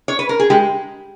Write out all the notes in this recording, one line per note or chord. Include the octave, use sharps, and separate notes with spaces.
C#5
B4
A#4
G#4
G#3 G4